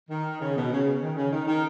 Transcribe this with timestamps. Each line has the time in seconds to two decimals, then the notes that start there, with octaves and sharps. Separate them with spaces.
0.10 D#3
0.41 C#3
0.56 B2
0.72 C#3
1.02 D#3
1.17 C#3
1.32 D#3
1.47 D#3